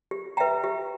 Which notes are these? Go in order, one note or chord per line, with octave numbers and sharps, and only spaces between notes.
G4
B4 E5 G5 A#5
G4